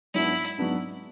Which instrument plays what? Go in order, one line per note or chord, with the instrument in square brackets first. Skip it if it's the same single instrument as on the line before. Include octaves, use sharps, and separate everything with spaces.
[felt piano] G#2 F#3 B3 D4 [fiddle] E4
[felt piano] G#2 F#3 B3 D4